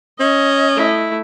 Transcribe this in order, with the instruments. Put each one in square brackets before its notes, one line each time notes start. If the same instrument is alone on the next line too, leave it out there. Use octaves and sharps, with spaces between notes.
[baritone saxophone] C#4 [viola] D#5
[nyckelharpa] A3 E4